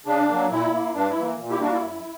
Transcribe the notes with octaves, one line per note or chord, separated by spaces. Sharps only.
C#3 D4
F#3 A#3
A#2 E4
A#3
G2 D4
E4
E3 A#3
A#2
E4 G4
G3 A#3 D4 F#4
E4
F#2